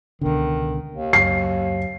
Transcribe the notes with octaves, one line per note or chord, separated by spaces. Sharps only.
C#2 B2 D3 D#3
D#2
C#2 F#2 C7